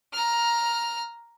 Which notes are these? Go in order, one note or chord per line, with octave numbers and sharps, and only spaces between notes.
A#5 F6